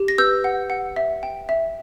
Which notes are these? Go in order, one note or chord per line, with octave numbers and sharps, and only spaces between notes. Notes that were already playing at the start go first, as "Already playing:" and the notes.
Already playing: G4
A#6
B4 E6 G6
F#5
F#5
E5
G5
E5